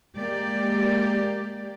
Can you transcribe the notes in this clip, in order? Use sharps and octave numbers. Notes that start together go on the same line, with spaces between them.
G#3 A#3 G4 D5